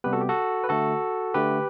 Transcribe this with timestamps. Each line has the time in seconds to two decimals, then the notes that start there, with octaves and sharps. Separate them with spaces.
0.04 C3 G3 B3 G4 B4
0.13 F#4 A4
0.21 G4
0.29 F#4 A4
0.64 B4
0.69 D3 A3 F#4 A4
1.34 D3 A3 G4 B4